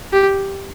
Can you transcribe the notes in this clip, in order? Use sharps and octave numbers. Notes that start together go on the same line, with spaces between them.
G4